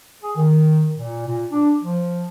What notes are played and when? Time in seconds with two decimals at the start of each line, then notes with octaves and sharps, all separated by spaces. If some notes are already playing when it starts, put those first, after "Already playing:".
0.23 G#4
0.36 D#3
0.97 A#2
1.27 A#2
1.52 D4
1.83 F3